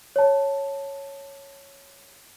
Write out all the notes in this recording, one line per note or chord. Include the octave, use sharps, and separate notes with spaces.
C#5 A5